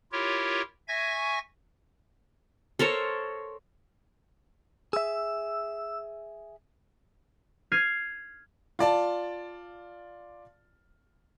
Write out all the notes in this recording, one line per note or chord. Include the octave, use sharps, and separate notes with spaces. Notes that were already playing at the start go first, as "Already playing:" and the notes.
E4 F4 G4 A#4 C#5
E5 G#5 C#6 G#6 A#6
A4 A#4 C5 C#5
G#4 E5 E6
F6 G#6 C7 D#7
F4 D5 A5